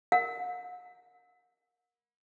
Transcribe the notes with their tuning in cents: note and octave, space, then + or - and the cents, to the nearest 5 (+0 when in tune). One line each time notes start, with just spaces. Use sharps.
A#4 +0 F#5 -40